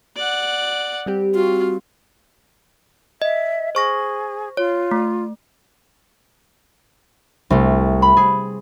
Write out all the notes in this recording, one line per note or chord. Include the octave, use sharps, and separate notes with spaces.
D5 F#5
G3 C4 G4
F4 F#4
D#5 E5
G#4 C5 C#6 A#6
F4 C#5
A3
C2 A3
B5
G#4